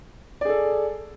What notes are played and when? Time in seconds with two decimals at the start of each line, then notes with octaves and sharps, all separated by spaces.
0.41 D5
0.45 G#4
0.49 A4